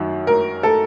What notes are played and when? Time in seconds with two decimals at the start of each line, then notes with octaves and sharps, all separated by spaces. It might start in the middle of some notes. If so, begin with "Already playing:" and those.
Already playing: F#2 D#3 F#3
0.27 A#4
0.63 A4